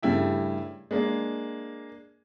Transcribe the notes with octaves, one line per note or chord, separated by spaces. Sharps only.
G2 C#3 A3 E4 G4
G#3 A#3 D4